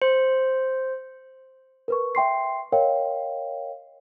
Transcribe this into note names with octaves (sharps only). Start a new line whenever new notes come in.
C5
A#4 B4 C#6
E5 G5 C6 C7
A#4 C#5 D#5 F5 G5